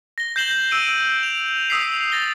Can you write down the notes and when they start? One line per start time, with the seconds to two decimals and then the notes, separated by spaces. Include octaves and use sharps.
0.18 A#6 G7
0.36 G6 A#6 C7 E7 F#7 G7
0.71 E6 D7 D#7
1.23 F7
1.70 D#6 E6 B6 C7
2.12 A6 A#6 G7